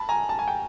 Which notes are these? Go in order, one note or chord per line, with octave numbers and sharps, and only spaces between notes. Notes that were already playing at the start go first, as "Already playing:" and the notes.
Already playing: A5 B5
G#5 A#5
A5
G#5
G5